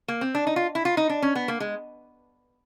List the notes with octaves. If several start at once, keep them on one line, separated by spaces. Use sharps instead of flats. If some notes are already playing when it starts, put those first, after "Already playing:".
A#3
C4
D4
D#4
F4
E4
F4
D#4
D4
C#4
B3
A#3
G#3